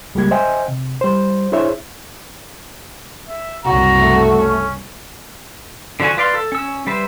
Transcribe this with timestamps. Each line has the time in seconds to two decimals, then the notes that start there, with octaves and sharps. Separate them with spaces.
0.15 C#2 G3 G#3 A#3 G4 G#6
0.31 C5 D#5 E5 G5 G#5
0.68 C3
1.01 G3 C5
1.52 D4 E4 G#4 C5 C#5 E5
3.29 E5
3.65 F#1 C2 F#4 A#5
4.01 A3
4.39 C#4
6.00 D3 F3 D4 F#4 G#5
6.17 F4 B4 D5 F5 C6
6.34 A4
6.52 C#4 E6
6.87 G3 B4 C5 E5